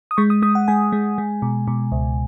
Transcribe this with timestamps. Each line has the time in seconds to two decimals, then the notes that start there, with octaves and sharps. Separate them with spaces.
0.11 D#6
0.17 G#3 C#6
0.30 D#6
0.42 G#3 D#6
0.55 F#5
0.68 G#3 G#5
0.92 G#3
1.18 G#3
1.42 B2
1.68 B2
1.92 C#2